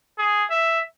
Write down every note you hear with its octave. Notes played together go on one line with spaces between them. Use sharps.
G#4
E5